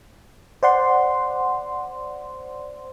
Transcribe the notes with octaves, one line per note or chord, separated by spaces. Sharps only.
C5 D5 F#5 C6